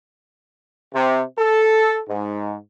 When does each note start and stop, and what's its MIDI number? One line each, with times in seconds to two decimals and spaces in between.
0.93 1.22 48
1.38 2.00 69
2.08 2.56 44